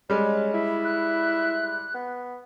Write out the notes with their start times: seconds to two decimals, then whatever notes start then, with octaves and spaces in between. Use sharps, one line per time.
0.10 G3 G#3 C#4
0.54 E4
0.84 F#6
1.94 B3